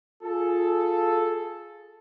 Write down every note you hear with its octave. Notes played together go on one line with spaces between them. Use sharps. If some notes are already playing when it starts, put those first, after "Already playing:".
F4 G#4 A4